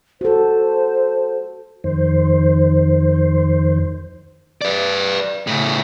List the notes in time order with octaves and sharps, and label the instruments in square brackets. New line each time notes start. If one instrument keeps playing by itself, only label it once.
[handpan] F#4 A4 [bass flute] C5
[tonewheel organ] F2 D#3 C5
[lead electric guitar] B4 D5
A2 C#3